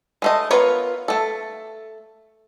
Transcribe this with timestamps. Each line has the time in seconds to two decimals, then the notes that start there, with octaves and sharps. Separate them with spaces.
0.22 G#3 A3 D#5
0.51 B3 F4 A#4 C#5
1.08 A3 A4